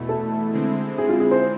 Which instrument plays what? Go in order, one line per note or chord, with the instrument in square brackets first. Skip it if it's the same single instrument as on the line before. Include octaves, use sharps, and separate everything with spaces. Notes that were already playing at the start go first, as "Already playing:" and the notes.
Already playing: [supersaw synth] E2 B2 A3 E4
[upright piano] A4
[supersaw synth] D3 G#3 C4 E4
[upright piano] G#4
F4
G#4
C5